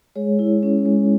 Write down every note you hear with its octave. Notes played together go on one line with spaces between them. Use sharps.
G#3 G#4 C#5
E4
C#4
G#3